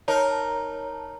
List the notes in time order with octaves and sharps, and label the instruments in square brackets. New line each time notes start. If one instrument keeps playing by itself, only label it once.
[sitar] D#4 A#4 [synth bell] C#5 A5